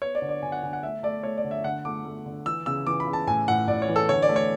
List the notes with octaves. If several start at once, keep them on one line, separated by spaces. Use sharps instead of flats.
B3 C#5
D5
D3
D5
D3 G#5
F#5
D3 G#5
F#5
A3 E5
A3 D5
A3 C#5
D5
D3
E5
D3 F#5
A3 D6
A3
D3
E3 E6
C#3 E6
E3 D6
B5
C#3
A5
A2 G#5
A2 F#5
A2 D5
C#5
E3
A4
D3 C#5
D5
A3
C#5